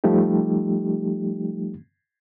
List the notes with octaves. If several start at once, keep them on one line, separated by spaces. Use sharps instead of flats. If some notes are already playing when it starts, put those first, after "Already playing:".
F3 G3 A3 D#4 G4